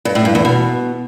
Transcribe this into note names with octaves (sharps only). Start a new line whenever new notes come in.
G2
A2
G2
E2
B2